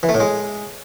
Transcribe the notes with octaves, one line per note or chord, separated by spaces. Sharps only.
E3
A3
A2
G#3